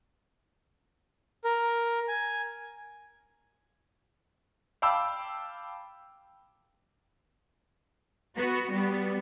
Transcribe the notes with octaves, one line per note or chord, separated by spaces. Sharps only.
A#4
G#5
F5 G5 A5 B5 D6 E6
B3 F#4
G3 B3